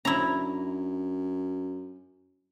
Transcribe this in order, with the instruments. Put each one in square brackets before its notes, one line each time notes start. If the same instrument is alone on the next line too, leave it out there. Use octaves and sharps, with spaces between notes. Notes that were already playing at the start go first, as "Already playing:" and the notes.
[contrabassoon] F#2 [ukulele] C#4 D4 B5 [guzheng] E4 A#5